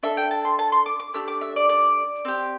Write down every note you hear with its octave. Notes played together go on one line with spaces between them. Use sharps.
D4 A4 E5
G5
A5
C6
A5
C6
D6
D6
A3 D4 G4 E6
D6
E5
D5
D5
C4 G4